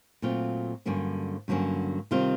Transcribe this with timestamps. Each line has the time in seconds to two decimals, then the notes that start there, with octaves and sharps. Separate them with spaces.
0.22 A#2 F#3 A3 C4 F4
0.86 G2 D3 F#3 A#3 C#4
1.48 G2 D3 F#3 A#3 C#4
2.11 C3 D#3 G3 C4 F4